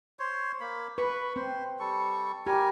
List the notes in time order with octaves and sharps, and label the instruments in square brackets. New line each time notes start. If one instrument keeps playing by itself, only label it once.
[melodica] C5 C#5
A#3 B5
[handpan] B4 [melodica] B5 C#6
[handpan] C4 [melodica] C5
[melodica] G3 A4 C#6
[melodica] G3 A#4 G#5 [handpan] G4